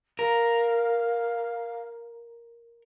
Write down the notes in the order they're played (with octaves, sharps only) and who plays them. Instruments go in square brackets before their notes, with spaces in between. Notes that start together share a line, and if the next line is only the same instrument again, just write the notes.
[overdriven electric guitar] A#4 [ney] F5